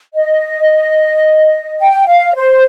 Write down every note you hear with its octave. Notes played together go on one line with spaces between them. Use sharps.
D#5
G5
F5
C5